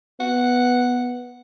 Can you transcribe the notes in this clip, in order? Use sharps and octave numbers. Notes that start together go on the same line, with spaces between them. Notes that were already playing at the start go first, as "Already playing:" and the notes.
B3 F#5